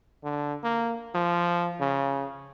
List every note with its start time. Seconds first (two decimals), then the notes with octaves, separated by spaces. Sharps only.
0.23 D3
0.63 A#3
1.14 F3
1.80 C#3